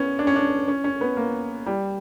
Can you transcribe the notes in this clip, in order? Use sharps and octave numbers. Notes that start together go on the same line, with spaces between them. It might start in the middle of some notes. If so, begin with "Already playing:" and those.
Already playing: B3 C#4
D4
C#4
D4
C#4
C#4
B3
A#3
G3